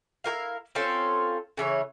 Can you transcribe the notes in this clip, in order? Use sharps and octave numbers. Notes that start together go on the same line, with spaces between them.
E4 G4 A#4 F5
C4 C#4 F4 A4
C#3 E3 A#4 C#5